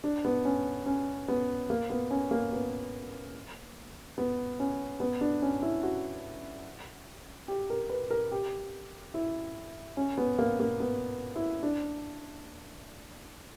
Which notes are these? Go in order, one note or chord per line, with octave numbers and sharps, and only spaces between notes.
D4
B3
C#4
C#4
B3
A#3
B3
C#4
A#3
B3
B3
C#4
B3
D4
C#4
E4
F#4
G4
A#4
B4
A#4
G4
E4
C#4
B3
A#3
A#3
B3
E4
D4